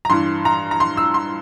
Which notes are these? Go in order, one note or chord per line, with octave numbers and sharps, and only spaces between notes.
A#5
G2 E3 C6
A#5
A#5
C6
E6
C6